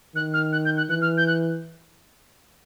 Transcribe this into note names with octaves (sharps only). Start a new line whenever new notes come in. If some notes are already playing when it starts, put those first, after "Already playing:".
D#3 F#6
F6
F#6
G6
F#6
E3 F#6
F6
G6
F#6